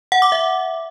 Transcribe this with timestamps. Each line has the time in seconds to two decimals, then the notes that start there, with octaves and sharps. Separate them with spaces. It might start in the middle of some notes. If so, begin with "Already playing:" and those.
0.12 F#5
0.22 D6
0.32 E5